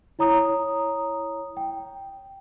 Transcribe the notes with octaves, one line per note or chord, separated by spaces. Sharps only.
E4 C#5 A#5 D#6
G5